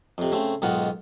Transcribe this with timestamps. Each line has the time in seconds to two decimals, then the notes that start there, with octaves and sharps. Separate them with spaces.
0.18 F2 C3
0.32 C#3 A3 C4
0.62 B1 G#2 D#3 F4 F#5